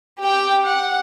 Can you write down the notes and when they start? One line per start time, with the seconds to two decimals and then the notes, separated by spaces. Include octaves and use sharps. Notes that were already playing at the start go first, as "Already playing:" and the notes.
0.20 G4 G5
0.64 F#5